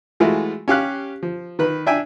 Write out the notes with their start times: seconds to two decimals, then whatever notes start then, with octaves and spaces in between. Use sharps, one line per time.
0.20 E3 G#3 A3 F4 F#4
0.68 C#4 G4 F5 F#6
1.23 F3
1.59 D#3 B4 B5
1.86 D4 E5 G5 G#5